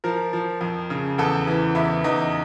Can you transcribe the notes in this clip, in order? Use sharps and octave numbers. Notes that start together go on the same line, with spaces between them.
F3 A#4
F3
F2
C#3
E2 A4
E3
E2 E4
E2 D#4